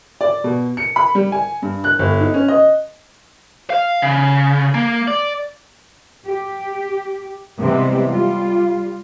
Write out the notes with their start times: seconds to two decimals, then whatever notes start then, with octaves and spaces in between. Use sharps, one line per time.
0.21 D5
0.44 B2
0.77 C#7
0.96 B5
1.15 G3
1.32 G#5
1.62 G2
1.84 F#6
1.99 G1
2.21 D#4
2.34 C#4
2.48 D#5
3.70 F5
4.02 C#3
4.74 A#3
5.08 D5
6.24 G4
7.59 C3 E3 G3 G#3 B3 C4
8.11 G3 F4